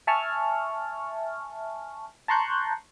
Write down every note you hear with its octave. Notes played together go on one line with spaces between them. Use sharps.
E5 G#5 A5 C#6 F6
A5 A#5 C6 C#6 F#6 G6